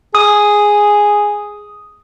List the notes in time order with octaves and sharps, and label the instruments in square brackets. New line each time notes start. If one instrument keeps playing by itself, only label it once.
[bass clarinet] G#4 [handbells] D#6